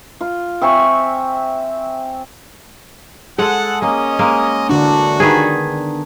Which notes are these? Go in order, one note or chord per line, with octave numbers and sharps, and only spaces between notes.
F4
C4 E5 G#5 C#6
G#3 G#4 A4 F#5
A#3 C#4 D#5
G#3 A#3 A#4
A2 D3 E3 D4 F#4
D#3 B3 G#4